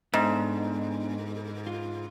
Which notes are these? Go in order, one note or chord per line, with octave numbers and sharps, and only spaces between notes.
G#2 B3 D4 A4
F4